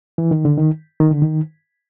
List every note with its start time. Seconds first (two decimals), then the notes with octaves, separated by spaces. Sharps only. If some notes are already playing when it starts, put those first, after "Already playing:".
0.18 E3
0.31 D#3
0.45 D3
0.58 D#3
1.00 D#3
1.11 D3
1.22 D#3